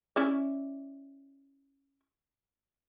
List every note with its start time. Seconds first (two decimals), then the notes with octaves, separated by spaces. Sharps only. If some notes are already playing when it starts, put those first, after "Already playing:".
0.16 C#4 E4 D5